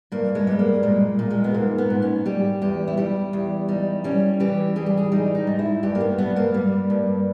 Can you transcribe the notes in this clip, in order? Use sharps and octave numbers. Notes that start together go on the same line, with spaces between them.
G2 A#3
G#3
G3 B3
A#3
A#2 G#3
A#2
G#3
B3
G#2 A#3
B3
G#2
C#4
G3 G4
E2 G4
E4
G3 G4
E2
G3 D#4
G3 C#4
E3 G4
G3 G#4
G4
G#4
G3 D#4
D#4
G#2
E4
G2 G4
A#3
B3
G2 B3
A#3
G3
G2